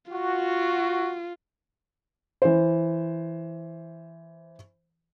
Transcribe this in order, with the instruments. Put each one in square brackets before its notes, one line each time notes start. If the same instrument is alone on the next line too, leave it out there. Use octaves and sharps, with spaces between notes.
[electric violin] F4 [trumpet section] F#4
[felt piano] E3 C5